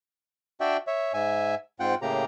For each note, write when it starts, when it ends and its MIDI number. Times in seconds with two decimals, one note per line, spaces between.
0.61 0.77 62
0.61 0.77 66
0.61 0.77 74
0.61 0.77 76
0.61 0.77 79
0.87 1.13 73
0.87 1.13 76
1.14 1.55 44
1.14 1.55 76
1.14 1.55 80
1.80 1.95 44
1.80 1.95 60
1.80 1.95 65
1.80 1.95 78
1.80 1.95 79
2.02 2.25 45
2.02 2.25 49
2.02 2.25 58
2.02 2.25 67
2.02 2.25 82